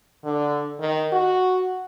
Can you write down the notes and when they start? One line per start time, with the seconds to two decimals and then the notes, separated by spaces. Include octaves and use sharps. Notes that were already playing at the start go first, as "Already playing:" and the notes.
0.24 D3
0.80 D#3
1.13 F#4